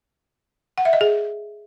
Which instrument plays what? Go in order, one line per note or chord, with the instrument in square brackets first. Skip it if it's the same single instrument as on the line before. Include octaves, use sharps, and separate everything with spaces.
[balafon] F#5
E5
D#5
G#4